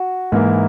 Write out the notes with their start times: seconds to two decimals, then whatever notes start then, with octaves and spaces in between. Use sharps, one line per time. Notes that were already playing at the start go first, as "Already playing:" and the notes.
Already playing: F#4
0.32 G#2 E3 A#3 E4